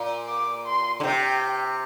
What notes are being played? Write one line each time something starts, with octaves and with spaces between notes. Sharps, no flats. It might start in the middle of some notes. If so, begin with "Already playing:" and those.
Already playing: A#2
D6
C6
D3
C3 G5